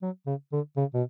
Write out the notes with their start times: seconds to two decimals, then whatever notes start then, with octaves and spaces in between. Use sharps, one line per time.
0.02 F#3
0.27 C#3
0.53 D3
0.77 C#3
0.94 B2